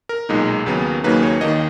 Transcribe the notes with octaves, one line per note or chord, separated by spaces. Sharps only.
A#4
B1 A#2 G#3 D#4
D#2 C#3 F#3 B3
D#2 C#3 F#3 A#3 D#4 B4
C#5
D#2 D#3 A#3 D#5